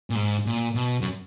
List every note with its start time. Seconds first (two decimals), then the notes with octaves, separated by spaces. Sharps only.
0.10 A#2
0.15 G#2
0.46 A#2
0.75 B2
1.01 F#2